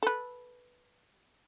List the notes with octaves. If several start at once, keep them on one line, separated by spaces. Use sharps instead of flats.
A4 B4